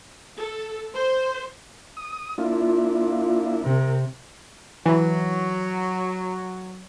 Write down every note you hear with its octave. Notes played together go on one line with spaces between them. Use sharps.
A4
C5
D#6
A#3 D4 E4 F4
C3 A#4
E3 F#3